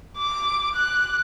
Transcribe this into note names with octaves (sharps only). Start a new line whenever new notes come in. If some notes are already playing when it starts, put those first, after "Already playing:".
D6
F#6